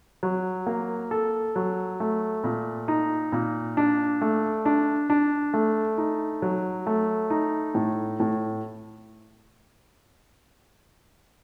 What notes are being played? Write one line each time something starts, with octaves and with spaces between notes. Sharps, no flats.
F#3
A#3
A4
F#3
A3
A#2
D#4
A#2
D4
A3
D4
D4
A3
D#4
F#3
A3
D#4
A2
A2